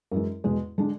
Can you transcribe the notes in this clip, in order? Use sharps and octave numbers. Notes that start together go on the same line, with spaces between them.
F#2 E3 G#3
E2 B2 G#3
D3 G#3 D4